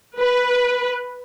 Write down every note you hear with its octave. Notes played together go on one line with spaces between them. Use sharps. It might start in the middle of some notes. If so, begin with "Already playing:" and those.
B4